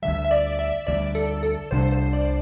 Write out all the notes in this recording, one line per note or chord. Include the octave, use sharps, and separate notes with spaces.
D2 D3 G3 E5
E5
D5
E5
D2 D3 G3 D5
A4
A4
C2 C3 G3 D4 C5
C5
D5